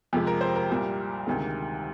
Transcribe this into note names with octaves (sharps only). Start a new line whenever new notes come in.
F2 C3 F3 G#3 G4
A#4
C5
A#4
C2 A#2 G3
D2 C3 D#3 G#3